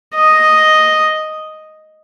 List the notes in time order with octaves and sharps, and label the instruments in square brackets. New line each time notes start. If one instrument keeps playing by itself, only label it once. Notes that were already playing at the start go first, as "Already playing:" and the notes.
[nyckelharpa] D#5